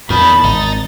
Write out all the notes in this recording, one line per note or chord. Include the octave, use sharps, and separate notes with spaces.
E2 A#2 D#3 A5 B5
G#1 D#4 A6